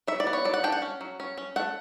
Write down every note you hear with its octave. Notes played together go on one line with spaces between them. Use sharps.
F#3 E5
D5
B3
C#5
F#3 D5
F#5
D4 G5
F#5
C#4
F#3
C#4
C#4
A3 F#5